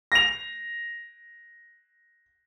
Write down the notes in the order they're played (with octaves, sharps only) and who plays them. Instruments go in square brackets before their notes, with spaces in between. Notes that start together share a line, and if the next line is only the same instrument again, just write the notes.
[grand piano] A#6 F7